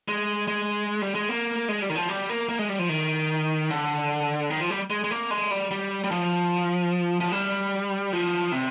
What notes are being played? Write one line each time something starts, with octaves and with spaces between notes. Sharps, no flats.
G#3
G#3
G3
G#3
A#3
G#3
G3
D#3
F3
G3
A#3
A#3
G#3
G3
F3
D#3
D3
D#3
F3
G3
G#3
G#3
A#3
G#3
G3
G3
G3
F3
F3
G3
F3
C3